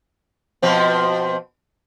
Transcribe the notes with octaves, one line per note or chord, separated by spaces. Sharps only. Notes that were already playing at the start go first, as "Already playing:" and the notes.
B2 F3 C4